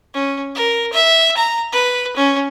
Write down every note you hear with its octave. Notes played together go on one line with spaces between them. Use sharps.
C#4
A#4
E5
A#5
B4
C#4